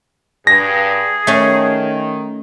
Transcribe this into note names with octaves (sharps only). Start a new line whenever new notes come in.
G2 G#4 A#6
D#3 A3 C#4